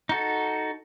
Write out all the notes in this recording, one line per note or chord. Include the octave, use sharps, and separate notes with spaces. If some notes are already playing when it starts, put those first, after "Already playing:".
D#4 F#4 A4